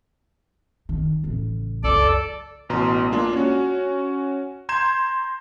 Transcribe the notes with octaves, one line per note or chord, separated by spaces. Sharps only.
D#3
A1 C#3
C#2 F#2 A4 D5
A1 B2 A#5 C6
G#3 A#3 D4 F4
C#4 F#4
A#5 C6 G6 G#6 E7